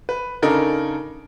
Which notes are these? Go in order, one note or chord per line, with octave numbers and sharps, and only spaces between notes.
B4
C#3 D4 D#4 A4 A#4